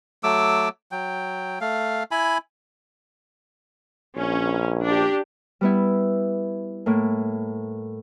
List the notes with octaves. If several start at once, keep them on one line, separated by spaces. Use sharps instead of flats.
F#3 A3 D6 E6
F#3 G5
A3 F5
E4 G#5 B5
A#1 C#4
D4 G4
G3 B3 E4
A2 A#3